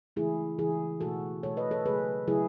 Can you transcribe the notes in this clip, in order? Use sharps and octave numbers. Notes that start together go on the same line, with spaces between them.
C#3 E3 A3 E4 G#4
C#3 E3 A3 E4 G#4
B2 A3 F#4 A4
B2 A3 A4 C#5
B4 D#5
A4 C#5
C#3 F#3 A3 G#4 B4
C#3 F#3 A3 E4 G#4